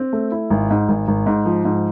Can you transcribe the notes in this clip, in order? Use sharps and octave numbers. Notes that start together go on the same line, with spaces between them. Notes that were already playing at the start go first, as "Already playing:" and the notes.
Already playing: C4
A3
E4
G#1
G#2
G#1
G#1
G#2
F3
G#2